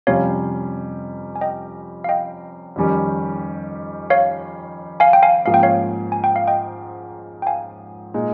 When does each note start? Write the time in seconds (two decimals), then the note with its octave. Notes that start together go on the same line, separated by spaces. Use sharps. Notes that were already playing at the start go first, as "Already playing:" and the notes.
0.07 F2 C3 G3 C#4 F4 C#5 F5
1.36 G#5
1.41 D#5 G5
2.04 F5
2.09 D#5 G5
2.76 F2 D#3 G3 C#4 G4
4.10 C#5 F5
5.00 F5 G#5
5.13 G5
5.23 F5 G#5
5.45 G#2 F3 A#3 C#4 F5
5.54 G5
5.63 C#5 F5
6.12 G#5
6.24 G5
6.36 F5
6.47 D#5 G5
7.42 G5
7.47 F5 G#5
8.14 A#2 G#3 D#4